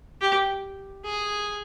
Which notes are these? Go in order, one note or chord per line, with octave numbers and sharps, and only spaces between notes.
G4
G#4